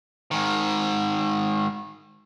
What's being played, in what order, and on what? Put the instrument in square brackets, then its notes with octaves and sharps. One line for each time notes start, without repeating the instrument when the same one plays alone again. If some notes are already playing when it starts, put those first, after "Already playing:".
[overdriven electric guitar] G#2 D#3